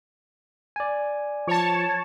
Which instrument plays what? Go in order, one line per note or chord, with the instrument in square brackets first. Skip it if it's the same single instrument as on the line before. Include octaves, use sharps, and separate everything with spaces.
[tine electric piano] D5 G#5
[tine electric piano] F3 [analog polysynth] C#5 A5